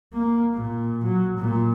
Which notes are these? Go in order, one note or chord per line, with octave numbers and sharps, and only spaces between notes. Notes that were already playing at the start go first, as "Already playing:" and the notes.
A#3
A#2
F#3
A#2